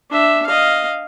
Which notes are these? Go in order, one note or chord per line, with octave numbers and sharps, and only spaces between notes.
D4 E5
D#5 F5